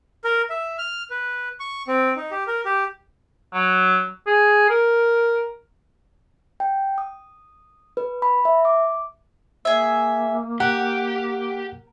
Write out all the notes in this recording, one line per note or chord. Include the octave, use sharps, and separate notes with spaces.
A#4
E5
F6
B4
C#6
C4
D#4
G4
A#4
G4
F#3
G#4
A#4
G5
D#6
B4
B5
E5
D6
A#3 G#4 E5
G4 A#4 F#5